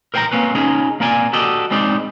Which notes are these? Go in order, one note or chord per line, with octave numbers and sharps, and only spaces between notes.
A#4 C5 G5 G#5 A#5
A#3 C4 C#4 B4
C#4 D#4 F4 G#4 A#4
A#3 C4 A#4 D5 G#5
F#4 G4 A4 D5 D#5
G3 G#3 C4 D#4 D5